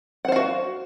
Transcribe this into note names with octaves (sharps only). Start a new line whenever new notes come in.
F#4 C5 F5 F#5